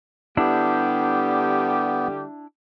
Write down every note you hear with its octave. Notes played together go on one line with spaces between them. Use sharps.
D3 G3 B3 D4 E4 G4